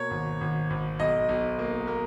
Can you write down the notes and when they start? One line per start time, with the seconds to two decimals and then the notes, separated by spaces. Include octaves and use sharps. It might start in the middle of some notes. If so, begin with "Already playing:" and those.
Already playing: B2 A#3 C#5
0.11 G#1
0.41 G#1
0.70 G#1
0.99 B1 D#5
1.29 B1
1.59 A#3
1.87 A#3